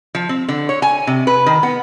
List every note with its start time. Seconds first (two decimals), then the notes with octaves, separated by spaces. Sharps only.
0.15 F3
0.29 C4
0.49 D3
0.69 C#5
0.82 G#5
1.07 C3
1.27 B4
1.46 D#3
1.63 B3